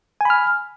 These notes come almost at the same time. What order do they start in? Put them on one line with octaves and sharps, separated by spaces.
G#5 B5 F6